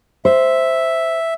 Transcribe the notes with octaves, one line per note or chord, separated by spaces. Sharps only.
C5 E5